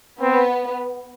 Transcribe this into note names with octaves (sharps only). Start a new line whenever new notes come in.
B3 C4